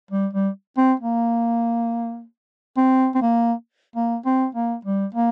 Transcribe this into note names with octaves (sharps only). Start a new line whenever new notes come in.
G3
G3
C4
A#3
C4
C4
A#3
A#3
C4
A#3
G3
A#3